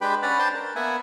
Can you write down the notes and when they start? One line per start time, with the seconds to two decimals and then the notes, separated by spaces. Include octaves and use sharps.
0.01 G#3 D4 G4 B4 G5 B5
0.22 C#4 B4 D5 F#5 B5 F6
0.39 D4 B4 C5 G5 A5 C6
0.55 A#4
0.75 A#3 B3 E5 F#5 G#5